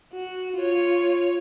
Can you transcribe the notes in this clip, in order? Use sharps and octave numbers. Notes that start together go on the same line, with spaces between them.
F#4
F4 C#5